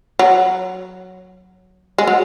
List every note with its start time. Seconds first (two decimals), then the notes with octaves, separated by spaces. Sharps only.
0.19 F#3
1.98 G#3
2.07 F#3